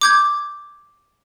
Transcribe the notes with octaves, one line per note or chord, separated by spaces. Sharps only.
D6 G6 G#6